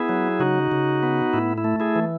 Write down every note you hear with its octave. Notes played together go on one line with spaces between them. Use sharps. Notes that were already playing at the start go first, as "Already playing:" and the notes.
Already playing: B3 E4 G#4
F#3
C#3 D#4 F#4
C#3
B3
A2 E4
E4
A3
E4 G#4
E3